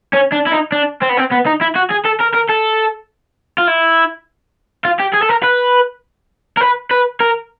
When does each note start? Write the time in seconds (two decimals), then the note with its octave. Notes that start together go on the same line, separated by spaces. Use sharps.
0.14 C#4
0.33 D4
0.47 E4
0.52 D#4
0.72 D4
1.02 C4
1.09 B3
1.17 C4
1.31 B3
1.46 D#4
1.61 E4
1.75 F#4
1.90 G#4
2.05 A4
2.20 A#4
2.34 A#4
2.49 A4
3.58 F4
3.67 E4
4.85 F4
5.00 G4
5.13 G#4
5.22 A4
5.29 A#4
5.43 B4
6.57 A#4
6.61 B4
6.91 B4
7.20 A#4